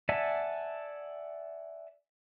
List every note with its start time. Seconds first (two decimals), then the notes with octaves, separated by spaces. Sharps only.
0.09 D5 E5 F#5 G#5 A5